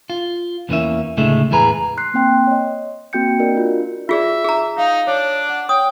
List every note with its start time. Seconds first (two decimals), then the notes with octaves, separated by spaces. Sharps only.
0.10 F4
0.69 E2 D3 E3 A#3 C#4 E5
1.17 C#2 A2 D3 G#3 A3 E5
1.51 E2 A2 G#4 B4 A#5
1.97 C6 F#6 C7
2.14 A#3 C4 G5 C6
2.47 C#5 D#5
3.13 A#3 C4 F#4 G5 G6 C#7
3.40 D4 F#4 A#4 D5 D#5
3.54 D4 F4
4.09 F4 G#4 D5 E5 B6
4.44 G#4 A#5
4.78 D#4 F5
5.07 D4 C#5
5.49 F#5
5.69 C#5 G5 D#6